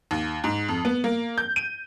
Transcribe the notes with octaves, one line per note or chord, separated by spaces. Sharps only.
D#2
G#2
F2
B3
A#3
G6
D#7